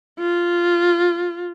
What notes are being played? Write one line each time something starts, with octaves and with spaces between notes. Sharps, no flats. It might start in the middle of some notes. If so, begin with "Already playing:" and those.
F4